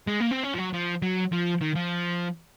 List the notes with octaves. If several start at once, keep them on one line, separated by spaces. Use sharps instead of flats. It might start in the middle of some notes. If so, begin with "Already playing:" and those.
G#3
A#3
C4
C#4
F3
F#3
F3
F#3
F3
D#3
F3